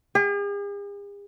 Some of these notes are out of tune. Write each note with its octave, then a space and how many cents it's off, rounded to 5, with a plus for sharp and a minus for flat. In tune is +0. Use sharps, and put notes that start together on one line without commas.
G#4 -45